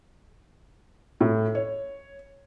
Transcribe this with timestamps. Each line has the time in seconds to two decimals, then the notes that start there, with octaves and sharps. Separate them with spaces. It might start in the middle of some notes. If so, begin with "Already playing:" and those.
1.21 A2
1.55 C#5